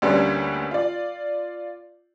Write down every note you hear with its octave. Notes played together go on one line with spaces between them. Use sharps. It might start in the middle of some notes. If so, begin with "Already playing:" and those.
D2 D3 G3 A#3 B3 C#4
F4 D5